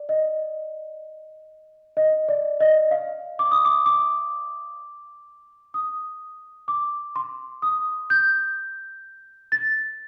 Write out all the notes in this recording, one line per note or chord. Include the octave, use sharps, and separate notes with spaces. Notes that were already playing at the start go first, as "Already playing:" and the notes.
Already playing: D5
D#5
D#5
D5
D#5
F5
D6
D#6
D6
D6
D#6
D6
C6
D#6
G6
A6